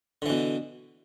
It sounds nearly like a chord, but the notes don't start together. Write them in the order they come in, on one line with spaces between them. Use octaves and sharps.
D3 E3 B2